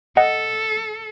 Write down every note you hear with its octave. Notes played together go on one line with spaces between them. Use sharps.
A4 D#5 F#5